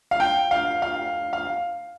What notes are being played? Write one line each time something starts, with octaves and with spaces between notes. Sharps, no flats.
F5
G5
F5
F5
F5